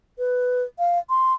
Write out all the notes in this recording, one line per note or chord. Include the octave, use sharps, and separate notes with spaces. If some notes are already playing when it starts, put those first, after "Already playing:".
B4
F5
C6